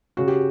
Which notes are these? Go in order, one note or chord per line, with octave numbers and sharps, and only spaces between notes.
C#3 F#4
G4